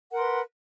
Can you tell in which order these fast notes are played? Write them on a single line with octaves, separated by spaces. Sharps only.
F#5 A#4 C6 B4